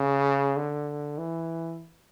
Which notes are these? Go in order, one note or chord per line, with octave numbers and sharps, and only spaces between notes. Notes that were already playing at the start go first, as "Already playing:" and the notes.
Already playing: C#3
D3
E3